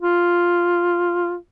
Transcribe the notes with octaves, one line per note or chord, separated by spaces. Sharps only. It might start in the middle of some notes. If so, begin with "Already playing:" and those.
F4